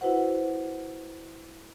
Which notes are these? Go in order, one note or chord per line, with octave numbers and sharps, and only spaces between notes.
E4 F#4 B4 C5 F#5